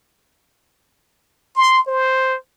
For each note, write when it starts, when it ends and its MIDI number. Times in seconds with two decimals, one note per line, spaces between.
1.56 1.82 84
1.88 2.36 72